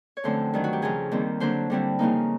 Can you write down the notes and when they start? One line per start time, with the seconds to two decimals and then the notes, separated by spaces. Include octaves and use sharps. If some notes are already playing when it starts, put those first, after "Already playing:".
0.17 C#5
0.24 F#2 D3 F3 A3 C4 C5
0.54 G2 D#3 F#3
0.64 F#4
0.73 G4
0.82 F2 C#3 F3 G#4
1.12 D#2 D#3 G3 C4
1.40 D3 F#3 A#3 D4 C5
1.70 D3 G3 C4 E4
1.99 C#3 F3 A#3 D#4